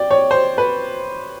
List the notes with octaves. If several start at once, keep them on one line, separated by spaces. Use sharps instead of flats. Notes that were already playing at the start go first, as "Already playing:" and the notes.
Already playing: D5 G5
C#5
C5
B4